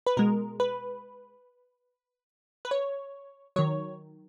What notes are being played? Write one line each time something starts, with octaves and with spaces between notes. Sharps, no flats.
B4
B2 G#3 A#4
B4
B4
C#5
D#3 F#3 C#5